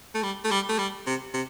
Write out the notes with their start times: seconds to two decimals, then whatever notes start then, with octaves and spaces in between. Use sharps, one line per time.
0.14 A3
0.23 G3
0.44 A3
0.51 G3
0.69 A3
0.78 G3
1.07 C3
1.34 C3